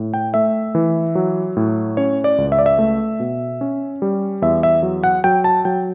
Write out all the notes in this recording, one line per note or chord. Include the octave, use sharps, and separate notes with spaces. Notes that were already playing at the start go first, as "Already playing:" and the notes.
Already playing: A2
G5
A3 E5
E3
F#3
A2
C#4 C#5
D5
C#2
E5
D5
E5
A3
B2
C#4
G3
E2 E5
E5
F#3
F#5
F#3 G5
A5
F#3 G5